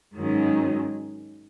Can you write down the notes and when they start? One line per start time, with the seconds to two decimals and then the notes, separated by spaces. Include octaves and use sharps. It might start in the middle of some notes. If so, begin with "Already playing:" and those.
0.15 G#2 D#3 F#3 C#4